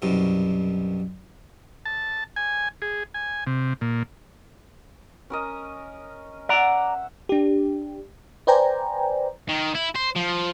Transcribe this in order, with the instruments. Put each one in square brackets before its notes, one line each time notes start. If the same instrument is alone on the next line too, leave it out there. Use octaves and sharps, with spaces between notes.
[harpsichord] C2 F#2 B2
[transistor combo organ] A5
G#5
G#4
G#5
C3
A#2
[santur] C#4 A#4 D#5
[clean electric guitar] D5 A#5 [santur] E5 F#5
[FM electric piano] D4 G4
B4 C5 D5 G5 G#5 A#5
[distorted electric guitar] D#3
E4
C5
F3